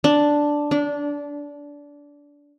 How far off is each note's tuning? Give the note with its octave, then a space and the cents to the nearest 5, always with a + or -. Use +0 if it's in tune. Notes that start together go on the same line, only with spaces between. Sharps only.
D4 +0
D4 -20